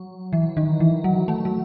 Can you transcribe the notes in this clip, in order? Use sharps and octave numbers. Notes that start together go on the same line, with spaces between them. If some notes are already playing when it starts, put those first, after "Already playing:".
Already playing: F#3
E3
D#3
E3
F#3
A3
F#3